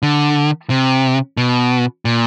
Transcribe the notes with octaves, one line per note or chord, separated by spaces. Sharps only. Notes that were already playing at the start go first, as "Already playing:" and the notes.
D3
C3
B2
A#2